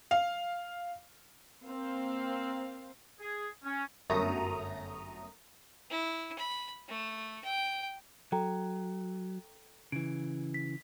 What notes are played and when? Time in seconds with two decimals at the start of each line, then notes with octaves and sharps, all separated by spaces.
0.11 F5
1.65 A#3 C4 C5 F5
3.20 G#4
3.65 C#4
4.10 G1 F#2 A3 A#5 D#6
5.91 E4
6.39 B5
6.89 A3
7.44 G5
8.32 F#3 A4 G5 A#5
9.92 C#3 E3 D7
10.54 B6